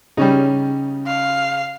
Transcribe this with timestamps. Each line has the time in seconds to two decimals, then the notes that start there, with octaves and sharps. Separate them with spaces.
0.17 C#3 G3 C#4 D#4
1.07 F5